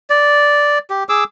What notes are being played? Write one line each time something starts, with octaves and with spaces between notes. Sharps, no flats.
D5
G4
G#4 D6 E6